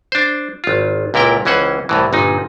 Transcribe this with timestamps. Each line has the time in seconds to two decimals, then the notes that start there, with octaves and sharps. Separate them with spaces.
0.12 D4 C5
0.64 G#1 F4
1.14 C#2 A#2 E4 A#4 G5
1.45 C#2 E3 C#4 C5 F#5
1.89 C2 A2 E3
2.13 G1 A#2 D#4